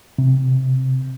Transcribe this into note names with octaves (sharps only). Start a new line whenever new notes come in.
C3